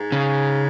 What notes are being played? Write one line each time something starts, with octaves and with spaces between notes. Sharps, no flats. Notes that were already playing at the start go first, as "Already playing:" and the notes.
Already playing: G#2
C#3